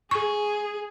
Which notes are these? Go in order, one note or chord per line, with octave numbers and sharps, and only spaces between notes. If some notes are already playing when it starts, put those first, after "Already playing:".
G#4 C#6